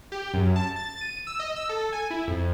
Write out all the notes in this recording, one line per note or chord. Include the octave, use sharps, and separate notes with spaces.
G4
F#2
A5
A6
D#7
E6
D#5
E6
A4
G#5
E4
F2